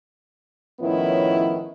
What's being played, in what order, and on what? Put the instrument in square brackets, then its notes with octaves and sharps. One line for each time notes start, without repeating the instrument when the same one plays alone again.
[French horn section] A2 D#3 F3 B3 C#4 E4